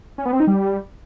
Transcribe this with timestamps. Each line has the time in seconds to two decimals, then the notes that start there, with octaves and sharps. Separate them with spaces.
0.18 C#4
0.25 B3
0.33 C4
0.40 D#4
0.47 G3